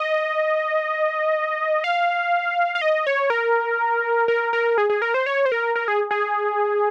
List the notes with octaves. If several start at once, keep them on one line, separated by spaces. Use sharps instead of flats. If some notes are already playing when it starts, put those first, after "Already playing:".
Already playing: D#5
F5
F5
D#5
C#5
A#4
A#4
A#4
G#4
G#4
A#4
C5
C#5
C5
A#4
A#4
G#4
G#4